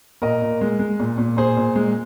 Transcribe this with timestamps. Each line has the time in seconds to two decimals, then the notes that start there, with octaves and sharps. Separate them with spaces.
0.22 A#2 A#4 D#5
0.42 A#2
0.61 G#3
0.79 G#3
1.00 A#2
1.18 A#2
1.37 A#2 G#4 C5
1.57 A#2
1.76 G#3